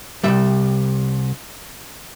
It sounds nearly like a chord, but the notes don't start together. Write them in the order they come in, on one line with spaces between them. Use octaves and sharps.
B2 G3 E5 C2